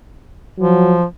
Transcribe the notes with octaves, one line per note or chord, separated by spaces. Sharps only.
F3 F#3